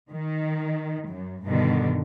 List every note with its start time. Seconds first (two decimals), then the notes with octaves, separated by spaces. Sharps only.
0.11 D#3
1.09 F#2
1.45 G2 B2 D3 D#3